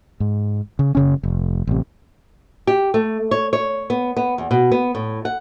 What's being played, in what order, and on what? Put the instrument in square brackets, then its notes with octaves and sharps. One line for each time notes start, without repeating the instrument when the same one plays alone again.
[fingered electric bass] G#2
C#3
F#1 C#3 C#4
F1
A1 C3
[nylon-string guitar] G4
A3
C#5
C#5
B3
B3
E2
B2
B3
A2
F#5